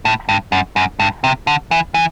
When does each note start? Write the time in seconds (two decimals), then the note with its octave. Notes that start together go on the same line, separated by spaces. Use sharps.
0.05 A2
0.29 G2
0.52 F#2
0.76 F#2
1.00 G2
1.24 C3
1.47 D3
1.71 E3
1.94 E3